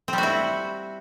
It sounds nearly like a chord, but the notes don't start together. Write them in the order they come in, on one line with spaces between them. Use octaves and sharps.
C4 G3 F#4 E4